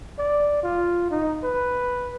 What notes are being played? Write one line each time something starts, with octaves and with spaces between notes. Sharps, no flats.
D5
F4
D#4
B4